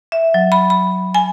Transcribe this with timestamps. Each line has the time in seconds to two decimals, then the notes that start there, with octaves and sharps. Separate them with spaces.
0.12 E5
0.34 F#3
0.52 B5
0.70 B5
1.14 G#5